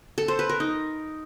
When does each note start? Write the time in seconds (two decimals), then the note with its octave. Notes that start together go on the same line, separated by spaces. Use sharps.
0.18 A4
0.28 C5
0.39 B4
0.49 A#4
0.60 D#4